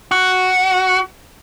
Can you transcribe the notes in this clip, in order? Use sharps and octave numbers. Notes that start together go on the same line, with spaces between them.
F#4